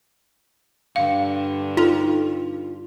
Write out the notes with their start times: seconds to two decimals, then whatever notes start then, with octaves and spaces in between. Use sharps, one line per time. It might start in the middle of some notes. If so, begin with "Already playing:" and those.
0.96 G2 D3 F5
1.77 D#4 F4 A4